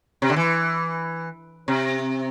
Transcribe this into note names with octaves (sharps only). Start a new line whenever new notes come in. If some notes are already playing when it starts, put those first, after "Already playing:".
C3
D3
E3
C3